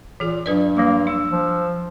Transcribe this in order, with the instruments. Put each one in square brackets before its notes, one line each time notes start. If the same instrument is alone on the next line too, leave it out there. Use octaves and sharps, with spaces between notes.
[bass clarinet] A#2 [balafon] E3 G#4
[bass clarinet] G2 [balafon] F#3 B4 D5
[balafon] F3 G3 [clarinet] A#3
[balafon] D4 [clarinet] E6
[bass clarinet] F3